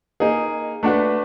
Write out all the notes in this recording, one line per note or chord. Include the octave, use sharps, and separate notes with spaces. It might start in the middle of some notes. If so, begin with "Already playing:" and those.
A#3 D#4 G#4
A3 D4 F#4 B4